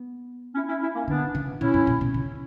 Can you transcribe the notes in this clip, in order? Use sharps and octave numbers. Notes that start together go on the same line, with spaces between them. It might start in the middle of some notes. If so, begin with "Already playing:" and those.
Already playing: B3
C#4 E4
C#4 E4
C#4 E4
A#3 C#4
D3 B3 D4
C#3
A#2 C#4 E4
G2
A#2
B2
C#3